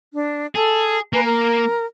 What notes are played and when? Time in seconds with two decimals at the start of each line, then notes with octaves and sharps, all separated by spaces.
0.13 D4
0.55 G#4 A4
1.13 A#3 B4 G#5 A#5
1.25 A#4